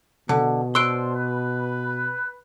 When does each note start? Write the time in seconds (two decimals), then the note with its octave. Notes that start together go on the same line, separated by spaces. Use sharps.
0.29 B2 D3
0.75 D4 C5 C6 E6 F#6 D7
1.15 B4